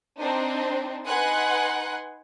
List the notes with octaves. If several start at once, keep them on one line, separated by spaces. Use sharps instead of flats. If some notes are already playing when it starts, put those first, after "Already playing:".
C4 D4 D#4 C5
D#4 B4 F#5 G#5 C6 F#6